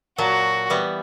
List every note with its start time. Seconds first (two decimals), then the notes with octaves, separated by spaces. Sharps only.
0.18 A#2 F#3 F#4 A5
0.70 E3 G3 B3